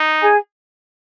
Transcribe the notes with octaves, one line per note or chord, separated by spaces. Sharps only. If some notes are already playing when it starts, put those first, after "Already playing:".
Already playing: D#4
G#4 G#5